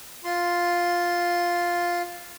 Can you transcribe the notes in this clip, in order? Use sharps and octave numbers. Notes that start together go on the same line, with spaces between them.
F4 C6